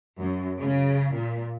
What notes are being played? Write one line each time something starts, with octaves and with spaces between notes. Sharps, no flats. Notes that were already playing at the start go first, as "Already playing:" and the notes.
F#2
C#3
A#2